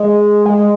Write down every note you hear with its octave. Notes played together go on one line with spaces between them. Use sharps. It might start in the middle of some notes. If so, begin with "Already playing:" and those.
Already playing: G#3
G#3